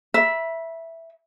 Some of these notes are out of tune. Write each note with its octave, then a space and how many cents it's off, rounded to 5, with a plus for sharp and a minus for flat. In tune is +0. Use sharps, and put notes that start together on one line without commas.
E5 +0 B5 -35